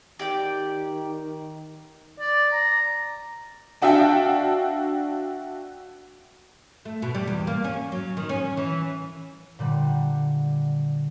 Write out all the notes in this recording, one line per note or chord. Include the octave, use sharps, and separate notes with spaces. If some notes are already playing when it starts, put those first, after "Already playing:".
D#3 G4 D5 G5
D5
A#5
D4 F#4 E5 F5 G5 A5
A3
B2
G3
E2
A#3
C#4
F#3
D#3
C#4
E3
A#2 D3 G3 F#5